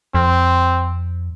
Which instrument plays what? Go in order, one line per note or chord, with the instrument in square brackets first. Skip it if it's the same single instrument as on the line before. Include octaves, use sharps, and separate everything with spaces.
[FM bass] F2 [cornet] C4